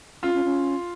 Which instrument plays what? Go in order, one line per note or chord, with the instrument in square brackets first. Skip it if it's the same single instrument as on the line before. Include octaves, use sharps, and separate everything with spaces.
[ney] C#4 [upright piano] F4
[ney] C#4
C#4